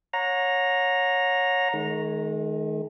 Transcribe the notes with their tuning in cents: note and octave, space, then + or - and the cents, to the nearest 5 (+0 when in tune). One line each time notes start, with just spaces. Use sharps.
C#5 -5 F#5 -35 A#5 +0
D#3 +0 G#3 +40